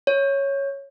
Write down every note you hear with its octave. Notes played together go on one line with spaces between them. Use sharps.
C#5